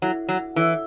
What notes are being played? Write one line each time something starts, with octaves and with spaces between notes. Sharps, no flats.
F#3 E4 A4 C#5 E5
F#3
E3 E4 A4 C#5 E5